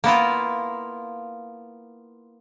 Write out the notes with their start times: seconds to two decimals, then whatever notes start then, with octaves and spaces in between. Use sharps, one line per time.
0.04 A#3 B3 E4 F4